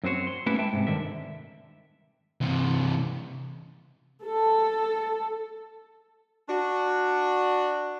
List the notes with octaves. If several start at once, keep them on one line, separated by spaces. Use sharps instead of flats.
F#2 C4 F#4 C5 C#5
C6
A3 B3 C#4 E4 G4 B4
G#3 E5 G5 A5
G#2 C3
G2 D3 D#3 E5
C3 E3
A4
D4 F#4